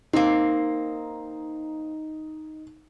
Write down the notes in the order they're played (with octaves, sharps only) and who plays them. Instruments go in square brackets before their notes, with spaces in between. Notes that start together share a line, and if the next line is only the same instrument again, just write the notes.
[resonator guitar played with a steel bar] A#3 C4 [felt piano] D#4